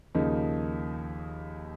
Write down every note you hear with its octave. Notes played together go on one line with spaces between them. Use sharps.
D#2 C#3 F3 A#3 D#4